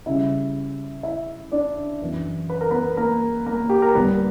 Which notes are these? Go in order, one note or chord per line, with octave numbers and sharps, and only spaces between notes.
C#3 G3 C#4 E4 E5
E4 E5
D4 D5
F#2 E3 B3
B4
A#4
B3 B4
A#3 A#4
A#3 A#4
G4
A#4
G2 D3 A#3 B3 D4 B4